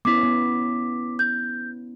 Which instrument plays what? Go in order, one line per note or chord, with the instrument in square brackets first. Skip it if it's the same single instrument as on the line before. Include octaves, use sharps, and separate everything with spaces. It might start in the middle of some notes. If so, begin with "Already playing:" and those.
[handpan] B3 C#4 E4 [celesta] D6 B6
[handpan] B3
[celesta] G6